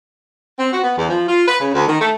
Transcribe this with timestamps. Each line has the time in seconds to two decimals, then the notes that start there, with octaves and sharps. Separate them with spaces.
0.59 C4
0.72 F#4
0.84 B3
0.98 E2
1.10 F3
1.28 F4
1.48 B4
1.61 C#3
1.74 D2
1.88 D#3
2.01 A3